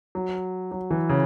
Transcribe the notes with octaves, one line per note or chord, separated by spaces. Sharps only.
F#3
F#3
E3
C#3